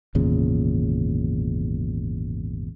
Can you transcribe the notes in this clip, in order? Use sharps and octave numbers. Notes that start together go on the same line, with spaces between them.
G#1 E2 A#2 C#3